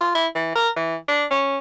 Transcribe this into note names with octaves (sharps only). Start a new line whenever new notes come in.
F4
E4
E3
A#4
E3
D4
C#4